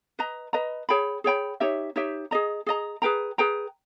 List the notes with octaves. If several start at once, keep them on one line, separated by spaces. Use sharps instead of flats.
B4 D#5 A#5
B4 D#5 A#5
G#4 C#5 G5 B5
G#4 C#5 G5 B5
D#4 G4 C#5 E5
D#4 G4 C#5 E5
G#4 D#5 A#5
G#4 D#5 A#5
G#4 B4 G5 A#5
G#4 B4 G5 A#5